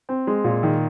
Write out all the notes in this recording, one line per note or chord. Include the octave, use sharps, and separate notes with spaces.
C4
G#3
A#2
D#3